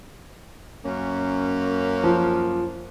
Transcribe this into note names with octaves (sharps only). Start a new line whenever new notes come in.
F#2 A#3 C#4
F3